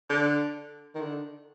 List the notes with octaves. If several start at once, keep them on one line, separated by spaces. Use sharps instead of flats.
D3
D#3
D3